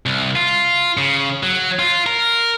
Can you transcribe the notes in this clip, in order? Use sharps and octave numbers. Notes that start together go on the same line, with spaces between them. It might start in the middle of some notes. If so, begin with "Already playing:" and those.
C2
F4
C#3
F#3
F4
A#4